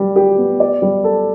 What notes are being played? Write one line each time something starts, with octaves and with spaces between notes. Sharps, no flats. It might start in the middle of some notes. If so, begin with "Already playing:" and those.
Already playing: G3
G4
B3
D5
G3
A4